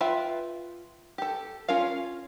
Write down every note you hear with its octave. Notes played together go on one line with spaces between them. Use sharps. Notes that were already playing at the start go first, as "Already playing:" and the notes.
F4 B4 E5 G5
G4 A4
C#4 F4 A#4 F5